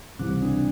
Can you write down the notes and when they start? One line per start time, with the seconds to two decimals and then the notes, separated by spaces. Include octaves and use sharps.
0.19 C#2 C3 E3 G3 C4
0.42 D4